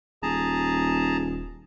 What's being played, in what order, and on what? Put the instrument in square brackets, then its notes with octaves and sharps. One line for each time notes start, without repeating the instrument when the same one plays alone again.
[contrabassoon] D#1 [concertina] G#4 A5 A#5